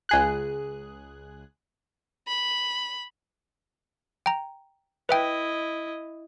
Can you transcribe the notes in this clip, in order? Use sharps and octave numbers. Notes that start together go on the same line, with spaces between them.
C#2 G#4 F#6
B5
G5 A#5
E4 B4 D#5 E5 G5